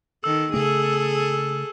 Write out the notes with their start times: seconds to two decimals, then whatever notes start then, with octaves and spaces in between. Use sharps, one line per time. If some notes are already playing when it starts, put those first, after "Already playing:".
0.24 D#3 A4 E6
0.53 C#3 A3 G#4 A4